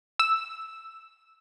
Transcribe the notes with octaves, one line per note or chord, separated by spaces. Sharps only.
E6